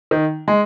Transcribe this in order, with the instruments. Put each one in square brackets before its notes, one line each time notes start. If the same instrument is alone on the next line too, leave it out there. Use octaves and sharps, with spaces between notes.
[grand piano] D#3
G#3